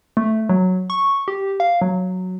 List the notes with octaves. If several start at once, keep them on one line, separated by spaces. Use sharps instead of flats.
A3
F#3
C#6
G4
F5
F#3